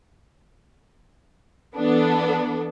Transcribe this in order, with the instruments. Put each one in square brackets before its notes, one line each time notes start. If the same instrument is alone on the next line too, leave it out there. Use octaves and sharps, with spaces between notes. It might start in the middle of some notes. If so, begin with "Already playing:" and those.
[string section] E3 B3 D4 A4